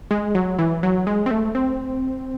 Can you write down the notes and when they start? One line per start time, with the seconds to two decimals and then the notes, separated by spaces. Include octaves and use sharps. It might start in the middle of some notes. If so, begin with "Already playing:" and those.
0.11 G#3
0.35 F#3
0.59 E3
0.83 F#3
1.07 G#3
1.26 C4
1.31 A3
1.55 C4